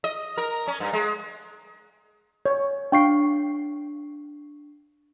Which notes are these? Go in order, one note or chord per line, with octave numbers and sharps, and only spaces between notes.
D#5
A#4
C#4
G2
G#3
C#5
D4 F5 G5 C#6 C7